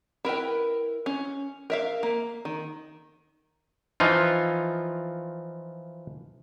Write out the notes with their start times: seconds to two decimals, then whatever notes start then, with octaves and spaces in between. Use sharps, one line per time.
0.25 E4 A#4 B4 G5
1.06 C#4
1.70 A#4 E5 F5
2.03 A#3
2.45 D#3
4.00 E3 F3 D#4 F4